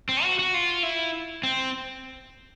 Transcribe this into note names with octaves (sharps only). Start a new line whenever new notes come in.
C4
F#4
F#4
F4
E4
C4